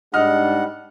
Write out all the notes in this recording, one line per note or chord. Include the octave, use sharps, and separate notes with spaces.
G#2 G3 D4 D#5 F#5 F6